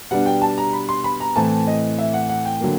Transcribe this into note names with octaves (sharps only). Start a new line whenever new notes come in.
B2 G3 B3 D4 F#5
G5
A5
A#5
B5
C6
B5
A#5
A2 E3 A3 C4 A5
D#5
E5
F#5
F#5
G5
D3 F#3 A#3